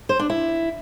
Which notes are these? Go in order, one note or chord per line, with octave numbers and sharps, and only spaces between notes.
C5
D4
E4